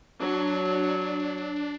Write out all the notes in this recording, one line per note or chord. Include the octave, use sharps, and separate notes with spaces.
F#3 D4